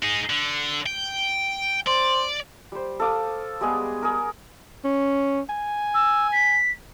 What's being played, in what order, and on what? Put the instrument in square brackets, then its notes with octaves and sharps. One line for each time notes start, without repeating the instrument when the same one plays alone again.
[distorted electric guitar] D#4 G#4
D3
G5
[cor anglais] C5 [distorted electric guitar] D5
[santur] G3 C5
A4 F5 D6 D#6
G3 G#3 B3 G#4
G#4 A#4
[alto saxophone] C#4
G#5
[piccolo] E6
B6